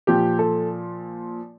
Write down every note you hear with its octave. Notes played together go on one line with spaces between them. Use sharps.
A#2 F3 G4
A4